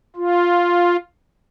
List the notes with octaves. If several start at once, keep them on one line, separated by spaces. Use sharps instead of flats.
F4